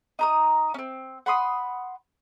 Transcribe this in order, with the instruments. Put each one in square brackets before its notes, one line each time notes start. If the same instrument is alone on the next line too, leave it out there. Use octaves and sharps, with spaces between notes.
[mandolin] D#4 A#5 D#6
C4 C#4
F#5 B5 C6 D#6